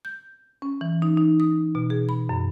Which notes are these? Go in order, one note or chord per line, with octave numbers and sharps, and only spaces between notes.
G6
C#4
E3
D#4
D#4
D#6
B2
G#4
B5
F#2